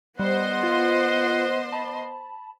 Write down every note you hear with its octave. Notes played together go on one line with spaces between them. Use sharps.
G3 B3 C5 D#5 F#5 C6
F4
A5 B5